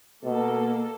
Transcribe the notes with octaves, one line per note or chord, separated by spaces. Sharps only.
B2 A#3 A4